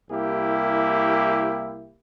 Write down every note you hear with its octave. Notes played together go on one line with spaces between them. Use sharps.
C2 A#3 E4 G4